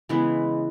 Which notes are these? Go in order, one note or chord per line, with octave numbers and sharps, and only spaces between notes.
C#3 E3 G#3 B3